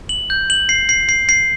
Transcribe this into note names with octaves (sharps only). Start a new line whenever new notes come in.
F#7
G6
F#7
C7
C7
C7
C7